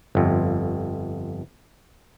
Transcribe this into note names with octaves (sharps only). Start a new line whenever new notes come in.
G1 F2